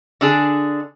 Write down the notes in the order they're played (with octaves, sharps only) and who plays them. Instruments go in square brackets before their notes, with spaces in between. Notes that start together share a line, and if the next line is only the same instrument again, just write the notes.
[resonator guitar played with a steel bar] D3 D4 G#4